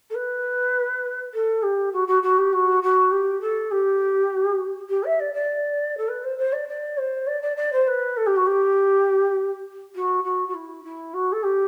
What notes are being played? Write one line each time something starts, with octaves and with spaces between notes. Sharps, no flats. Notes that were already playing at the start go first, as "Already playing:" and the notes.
A4
B4
A4
G4
F#4
F#4
F#4
G4
F#4
F#4
G4
A4
G4
G4
E5
D5
D5
A4
B4
C5
C5
D5
D5
C5
D5
D5
D5
C5
B4
A4
G4
F#4
G4
F#4
F#4
F#4
E4
E4
F#4
A4
G4